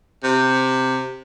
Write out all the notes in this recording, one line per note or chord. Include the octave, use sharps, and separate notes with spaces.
C3